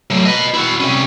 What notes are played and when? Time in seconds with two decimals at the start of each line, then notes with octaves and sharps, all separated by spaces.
0.11 F#3 A3
0.25 B4 D#5
0.54 E4 F#4
0.80 C3 C#4